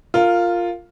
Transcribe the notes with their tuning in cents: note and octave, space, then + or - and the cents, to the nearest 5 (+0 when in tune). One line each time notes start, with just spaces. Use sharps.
F4 +0 A#4 -20